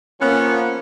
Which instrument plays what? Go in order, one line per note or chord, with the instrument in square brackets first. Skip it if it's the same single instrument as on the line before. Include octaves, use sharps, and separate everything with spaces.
[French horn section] F3 A#3 [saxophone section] B3 C#4